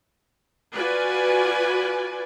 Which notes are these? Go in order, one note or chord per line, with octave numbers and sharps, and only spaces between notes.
F4 F#4 B4 D5 G#5